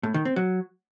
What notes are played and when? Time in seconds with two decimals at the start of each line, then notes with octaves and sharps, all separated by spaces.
0.03 A2
0.14 D#3
0.25 C4
0.36 F#3